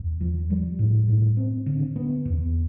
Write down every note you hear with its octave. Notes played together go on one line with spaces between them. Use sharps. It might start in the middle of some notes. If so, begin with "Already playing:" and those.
Already playing: E2
F3
G3
A2
A2
C4
D3
B3
E2